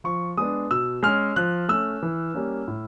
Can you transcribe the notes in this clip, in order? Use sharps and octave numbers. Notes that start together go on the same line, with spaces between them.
F3 C#6
G#3 B3 D4 D#6
B2 E6
G#3 C#4 F6
F3 F#6
A3 C#4 E6
E3
G3 A#3 C#4
A2